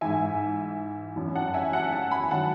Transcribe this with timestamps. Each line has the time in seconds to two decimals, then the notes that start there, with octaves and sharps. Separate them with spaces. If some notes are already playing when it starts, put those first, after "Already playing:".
0.01 G#2 E3 E5 G#5
1.16 F#2 E3
1.35 F#5 A5
1.54 E5 G#5
1.73 F#5 A5
1.92 F#5 A5
2.11 G#5 B5
2.31 D#3 F#3 F#5 A5